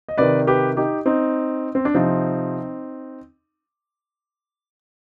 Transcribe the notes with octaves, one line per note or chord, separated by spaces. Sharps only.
D#5
C3 D#3 B4 D5
G4 B4
D#4 G4
C4 D#4
C4
D4
C3 F3 C4 D#4